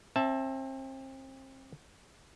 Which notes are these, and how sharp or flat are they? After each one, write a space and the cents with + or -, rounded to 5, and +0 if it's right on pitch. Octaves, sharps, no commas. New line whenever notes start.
C4 +35 E5 +0 A5 +0